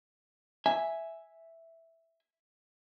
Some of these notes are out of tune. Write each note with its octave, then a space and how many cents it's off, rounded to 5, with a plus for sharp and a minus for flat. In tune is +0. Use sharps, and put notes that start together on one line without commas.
E5 +0 G#5 +0